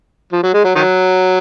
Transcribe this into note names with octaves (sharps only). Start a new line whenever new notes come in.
F3
F#3
G#3
F#3
D#3 F#3